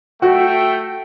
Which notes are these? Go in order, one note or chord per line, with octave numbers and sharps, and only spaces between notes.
A3 F#4 G5